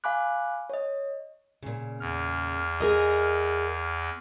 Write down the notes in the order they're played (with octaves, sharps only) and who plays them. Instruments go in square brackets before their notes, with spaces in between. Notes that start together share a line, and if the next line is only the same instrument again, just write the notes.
[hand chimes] F5 G#5 B5 D6 F#6
C#5 D#5
[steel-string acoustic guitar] A#2 C#3
[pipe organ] E2 F6
[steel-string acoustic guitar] G#4 A#4 D#5